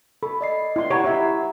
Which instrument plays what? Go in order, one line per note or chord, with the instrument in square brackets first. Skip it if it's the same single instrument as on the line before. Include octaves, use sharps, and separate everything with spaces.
[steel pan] A4 [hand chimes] B5
[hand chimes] D5 D#5 C7
[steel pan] E4 C6
[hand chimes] G4 F#5 A#5 [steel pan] C#5
[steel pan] E4 E5